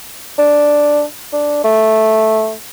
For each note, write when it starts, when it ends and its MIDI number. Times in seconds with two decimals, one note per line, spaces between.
0.38 1.03 62
1.33 1.64 62
1.64 2.53 57